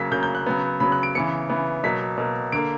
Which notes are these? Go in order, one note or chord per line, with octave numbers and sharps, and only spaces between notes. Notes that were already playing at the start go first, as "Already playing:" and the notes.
Already playing: C#3 F#3 A#3 B6
C#3 F#3 A#3 G6
G6
F#6
C#3 F#3 B3
C#3 F#3 B3 B5
F#6
D7
C#3 E3 B3 C#7
C#3 E3 B3
B2 F#3 A#3 B6
B2 F#3 A#3
D3 A#3 D7